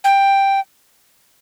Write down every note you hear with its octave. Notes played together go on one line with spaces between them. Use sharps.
G5